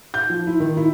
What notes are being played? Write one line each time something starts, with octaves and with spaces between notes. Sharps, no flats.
G6
F3
E4
D#3
E4